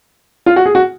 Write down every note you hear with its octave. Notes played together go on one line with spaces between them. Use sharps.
F4
F#4
G#4
F#4